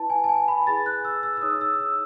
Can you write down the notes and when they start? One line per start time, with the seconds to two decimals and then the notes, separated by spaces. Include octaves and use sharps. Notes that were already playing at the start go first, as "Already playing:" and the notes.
Already playing: E4 B4 A5
0.10 G#5
0.24 A5
0.29 G#5
0.48 B5
0.67 E4 G#4 B4 A6
0.86 F#6
1.05 E6
1.23 E6
1.37 E6
1.42 D#4 G#4 C#5 D#6
1.61 E6
1.80 E6